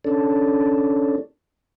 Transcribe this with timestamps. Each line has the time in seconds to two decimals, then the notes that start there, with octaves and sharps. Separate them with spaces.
0.04 C#4 D4 A4